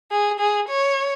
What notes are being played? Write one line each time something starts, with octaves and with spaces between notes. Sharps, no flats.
G#4
G#4
C#5